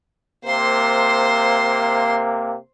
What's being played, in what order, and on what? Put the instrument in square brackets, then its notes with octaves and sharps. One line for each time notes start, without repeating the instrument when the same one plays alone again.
[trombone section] C3 A#3 [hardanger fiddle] C5 C6